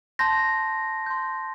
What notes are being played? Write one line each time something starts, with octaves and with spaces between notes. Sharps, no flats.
A5 C6 G6 A#6
C6 G6